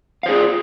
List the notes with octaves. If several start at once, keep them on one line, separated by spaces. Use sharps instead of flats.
D#4 F4 G#4 C5 F5